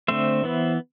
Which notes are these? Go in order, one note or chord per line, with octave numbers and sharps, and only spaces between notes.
D3 A3 C4 C5 E5
E3 B3